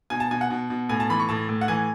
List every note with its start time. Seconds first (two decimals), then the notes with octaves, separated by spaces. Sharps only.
0.10 B2 G#5
0.20 A5
0.31 B2 G#5
0.41 F#5
0.50 B2
0.70 B2
0.89 A2 G#5
1.00 A5
1.10 E3 B5
1.20 C#6
1.29 A2 A5
1.49 A2
1.61 F#5
1.68 E3 G#5